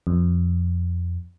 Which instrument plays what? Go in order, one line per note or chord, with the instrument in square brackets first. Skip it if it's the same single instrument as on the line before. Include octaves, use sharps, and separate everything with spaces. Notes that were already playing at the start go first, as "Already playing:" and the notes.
[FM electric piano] F2